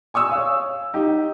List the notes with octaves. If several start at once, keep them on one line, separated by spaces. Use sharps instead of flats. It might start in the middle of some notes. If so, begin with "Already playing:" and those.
G#5 C#6 D#6 E6
C#5 F5
D#4 G4